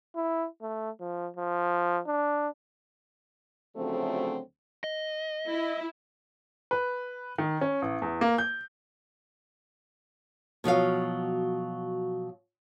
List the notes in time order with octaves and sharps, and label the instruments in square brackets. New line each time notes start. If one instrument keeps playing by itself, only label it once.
[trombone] E4
A3
F3
F3
D4
[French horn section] D2 C#3 F3 F#3 A3 C4
[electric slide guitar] D#5
[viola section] E4
[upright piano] B4
D#3
C#4
A1
E2
A#3
G6
[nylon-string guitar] B2 F3 F#3 F5